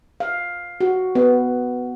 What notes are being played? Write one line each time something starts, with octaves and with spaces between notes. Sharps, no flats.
F5
F#4
B3